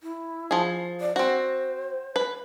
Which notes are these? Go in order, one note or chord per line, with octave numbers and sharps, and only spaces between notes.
E4
F3 G#4
D5
C4 F#4 C5
B4